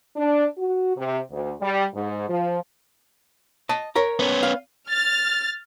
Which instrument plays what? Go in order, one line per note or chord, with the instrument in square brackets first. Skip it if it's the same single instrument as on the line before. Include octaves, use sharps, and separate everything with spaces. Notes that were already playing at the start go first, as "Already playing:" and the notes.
[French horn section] D4
F#4
C3
D2
G3
G#2
F3
[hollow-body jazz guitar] D#5 A5
A#4 C#5 A#5
[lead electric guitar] B3 C#4
[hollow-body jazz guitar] F5
[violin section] F6 A6